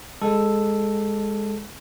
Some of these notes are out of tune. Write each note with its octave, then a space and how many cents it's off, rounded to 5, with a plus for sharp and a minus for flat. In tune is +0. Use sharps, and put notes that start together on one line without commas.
G#3 -10 A4 +0